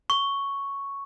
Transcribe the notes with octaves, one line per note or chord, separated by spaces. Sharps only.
C#6